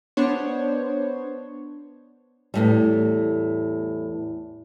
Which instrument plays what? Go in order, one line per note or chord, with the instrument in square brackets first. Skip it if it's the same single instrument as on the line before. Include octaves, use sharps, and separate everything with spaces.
[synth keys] B3 D4 C5 C#5
[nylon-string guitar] E2 A2 G3